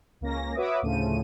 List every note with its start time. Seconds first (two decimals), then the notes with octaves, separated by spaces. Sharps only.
0.21 C#2 A#3 C#4 A#6
0.55 F#4 B4 C#5 E5 D6 D#6
0.82 D2 A2 C#3 F3 D#7